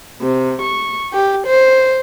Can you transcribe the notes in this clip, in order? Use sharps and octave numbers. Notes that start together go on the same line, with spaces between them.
C3
C#6
G4
C5